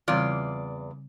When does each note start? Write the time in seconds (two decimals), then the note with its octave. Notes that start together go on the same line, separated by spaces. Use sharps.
0.08 E2 C#3 G3 C4 F4 D5